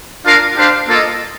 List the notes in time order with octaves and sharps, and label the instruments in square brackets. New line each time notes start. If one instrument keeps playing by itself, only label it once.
[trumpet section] D4 F4 A#4 F5
D4 G4 C5 F5
A#3 F4 A4 D#5